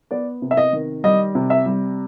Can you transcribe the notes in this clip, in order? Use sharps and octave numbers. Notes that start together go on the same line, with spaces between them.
B3 D5
C3
E5
D#5
D#3
G3 D#5
C3
E5
G3